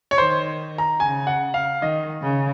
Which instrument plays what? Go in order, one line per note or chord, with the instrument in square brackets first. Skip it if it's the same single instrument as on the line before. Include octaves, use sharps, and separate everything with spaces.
[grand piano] C#5
[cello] D#3 [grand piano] C5
[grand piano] A#5
[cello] C#3 [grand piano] G#5
[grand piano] F#5
F5
[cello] D#3 [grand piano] D#5
[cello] C#3